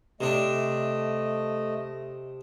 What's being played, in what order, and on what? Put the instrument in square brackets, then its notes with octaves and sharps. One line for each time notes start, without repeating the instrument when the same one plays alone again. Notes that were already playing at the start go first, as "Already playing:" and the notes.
[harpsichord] C3 D4 [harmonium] A3 D#5